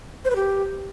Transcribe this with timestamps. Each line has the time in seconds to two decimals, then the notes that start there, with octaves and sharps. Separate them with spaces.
0.25 C5
0.30 B4
0.36 G4